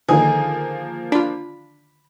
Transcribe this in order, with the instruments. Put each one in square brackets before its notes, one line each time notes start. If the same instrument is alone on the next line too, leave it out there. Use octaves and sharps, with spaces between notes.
[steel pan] D3 D#3 D#4 [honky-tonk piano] F3 A#3 [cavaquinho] G#4
[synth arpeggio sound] D4 F4 [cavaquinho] B5